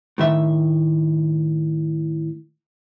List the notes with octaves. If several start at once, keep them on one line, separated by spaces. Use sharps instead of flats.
A2 D#3 E5